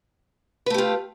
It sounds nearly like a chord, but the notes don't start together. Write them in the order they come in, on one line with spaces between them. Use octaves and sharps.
B4 A3 G4 F4